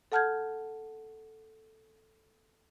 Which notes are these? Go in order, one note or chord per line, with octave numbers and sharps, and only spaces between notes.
A4 F#5 A5 F6 G6 G#6